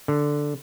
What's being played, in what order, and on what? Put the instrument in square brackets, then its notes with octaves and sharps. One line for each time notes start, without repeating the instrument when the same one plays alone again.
[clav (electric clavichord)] D3